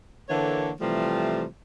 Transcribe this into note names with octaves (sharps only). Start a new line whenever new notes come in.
D3 E3 A#3 A4 C#5
C3 E3 F3 G3 A3